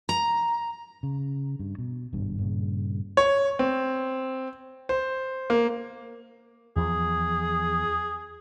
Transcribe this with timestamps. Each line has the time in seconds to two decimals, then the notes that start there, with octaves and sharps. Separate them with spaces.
0.09 A#5
1.03 C#3
1.59 G2
1.78 B2
2.13 G#1 G2 B2
2.39 G2 A#2 C#3
3.17 C#5
3.59 C4
4.89 C5
5.50 A#3
6.76 E2 F3 G#4